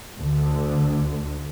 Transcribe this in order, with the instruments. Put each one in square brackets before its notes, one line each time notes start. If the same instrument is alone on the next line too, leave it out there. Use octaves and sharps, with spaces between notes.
[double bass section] D2 D3